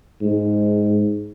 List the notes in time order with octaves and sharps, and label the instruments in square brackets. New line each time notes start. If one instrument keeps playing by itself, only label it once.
[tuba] G#2